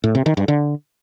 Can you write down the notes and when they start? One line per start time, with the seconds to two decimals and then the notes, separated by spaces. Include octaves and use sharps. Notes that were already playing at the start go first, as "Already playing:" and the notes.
0.04 A2
0.15 C3
0.26 D#3
0.37 G2
0.48 D3